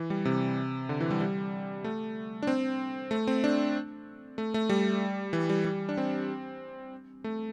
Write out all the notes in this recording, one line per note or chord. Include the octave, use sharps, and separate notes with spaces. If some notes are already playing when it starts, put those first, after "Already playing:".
Already playing: E3
G3
C3
D3
E3
G3
G3
A3
D4
C4
A3
C4
D4
A3
A3
G3
E3
G3
G3
D4
C4
A3